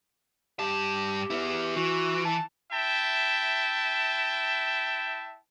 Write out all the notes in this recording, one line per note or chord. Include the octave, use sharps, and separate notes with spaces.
G2 G4 A5
B3 E4
E3 F#4
A5
E4 E5 G5 A5